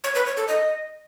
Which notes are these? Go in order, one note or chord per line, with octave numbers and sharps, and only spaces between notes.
C#5
B4
C#5
A4
D#5